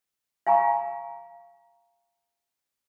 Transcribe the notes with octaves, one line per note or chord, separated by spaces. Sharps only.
F5 G#5 A#5 C#6